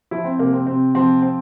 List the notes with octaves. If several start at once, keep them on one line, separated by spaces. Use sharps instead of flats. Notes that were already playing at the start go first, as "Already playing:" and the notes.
F3 E4
C4
C3 A#3
C4
C3 C4
F3 C4
C4